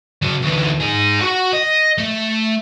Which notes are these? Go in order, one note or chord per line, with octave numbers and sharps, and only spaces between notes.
C#3 F#3
D2 E3
D#4 G#4
F#4 F#5
D#5
A3